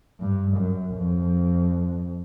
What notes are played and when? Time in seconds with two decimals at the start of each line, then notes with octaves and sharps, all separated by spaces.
0.20 G2
0.57 F#2
0.95 F2